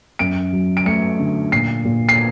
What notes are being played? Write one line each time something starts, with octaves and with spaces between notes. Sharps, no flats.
F#2 D7
F#3
D7
A3 C#7
D3
A#2 C7
A#2
C7